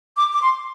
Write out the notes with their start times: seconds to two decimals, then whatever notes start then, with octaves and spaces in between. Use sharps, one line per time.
0.17 D6
0.33 D6
0.42 C6